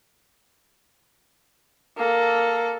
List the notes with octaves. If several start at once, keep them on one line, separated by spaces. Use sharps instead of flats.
A#3 A4